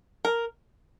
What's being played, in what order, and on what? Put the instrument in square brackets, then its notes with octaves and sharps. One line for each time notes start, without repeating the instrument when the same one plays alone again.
[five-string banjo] A#4